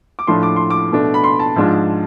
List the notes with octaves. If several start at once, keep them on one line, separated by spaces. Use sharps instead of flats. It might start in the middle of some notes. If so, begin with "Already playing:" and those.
D6
A2 F3 A3 D4 C6
D6
C6
D6
B2 A3 D4
B5
C6
A5
G#2 F3 G#3 D4 F4